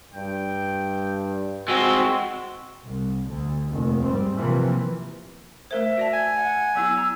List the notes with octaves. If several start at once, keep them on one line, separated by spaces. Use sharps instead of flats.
G2 G5
G#3 C4 F#4 E6
C2
D2
F1 D#2
G#2 G3 C4
C3 E3 F3 A#3
A3 A#4 C5 E5
F#4 D5 A5
G#5
F#5
F#3 B3 E4 E6
A#5